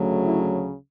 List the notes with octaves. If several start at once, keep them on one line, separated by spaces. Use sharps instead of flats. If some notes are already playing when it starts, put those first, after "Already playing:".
Already playing: D2 C#3 F#3 A3
E4